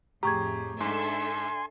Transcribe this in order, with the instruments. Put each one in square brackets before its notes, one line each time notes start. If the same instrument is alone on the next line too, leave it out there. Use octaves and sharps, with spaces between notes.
[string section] F2 A2 [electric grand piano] G4 G#4 [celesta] A#5 C#6 G#6
[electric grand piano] G#2 [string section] D4 A4 E5 [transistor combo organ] G#5 C6